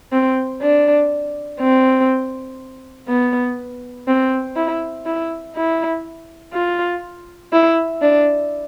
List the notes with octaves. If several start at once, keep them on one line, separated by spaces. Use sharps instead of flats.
C4
D4
C4
B3
C4
E4
E4
E4
F4
E4
D4